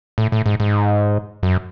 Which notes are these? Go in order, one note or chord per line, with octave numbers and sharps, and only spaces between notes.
A2
A2
G#2
G#2
F#2